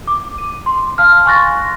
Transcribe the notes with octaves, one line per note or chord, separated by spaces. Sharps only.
D6
D#7
C6
F5 A5 F6
G#5 C6 C#6 F#6 A6 A#6